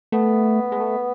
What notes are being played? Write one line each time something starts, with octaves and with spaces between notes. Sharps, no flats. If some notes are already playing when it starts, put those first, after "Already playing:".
A3 B3
G#3
A3